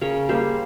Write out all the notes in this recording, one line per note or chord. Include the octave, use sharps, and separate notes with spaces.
C#3 A#4 C#5
G3 A#3 G#4 C5